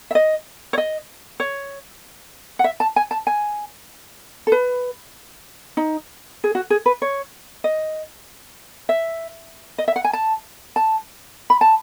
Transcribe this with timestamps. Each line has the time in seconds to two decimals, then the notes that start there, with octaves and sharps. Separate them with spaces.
0.11 E5
0.15 D#5
0.73 C#5
0.78 D#5
1.40 C#5
2.59 F#5
2.64 E5
2.80 A5
2.96 G#5
3.11 A5
3.27 G#5
4.47 A4
4.52 B4
5.77 D#4
6.44 G#4
6.55 F#4
6.70 G#4
6.86 B4
7.02 C#5
7.64 D#5
8.89 E5
9.78 D#5
9.88 E5
9.96 F#5
10.04 G#5
10.13 A5
10.76 A5
11.50 B5
11.61 A5